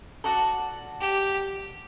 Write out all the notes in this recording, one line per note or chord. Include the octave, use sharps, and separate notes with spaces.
F#4 A4 D5 F#5
G4